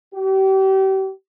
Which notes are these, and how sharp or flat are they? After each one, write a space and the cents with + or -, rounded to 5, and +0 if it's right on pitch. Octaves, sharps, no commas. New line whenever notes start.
G4 -35